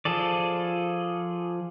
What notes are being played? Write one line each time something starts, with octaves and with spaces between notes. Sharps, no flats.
F3 G#4 A4 D5